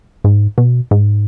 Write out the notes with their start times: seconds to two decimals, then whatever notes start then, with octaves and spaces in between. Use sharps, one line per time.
0.24 G#2
0.58 B2
0.91 G#2